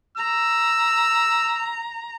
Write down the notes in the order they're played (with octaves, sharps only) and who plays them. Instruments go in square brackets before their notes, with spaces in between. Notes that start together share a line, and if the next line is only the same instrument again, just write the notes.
[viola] A#5 [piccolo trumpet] E6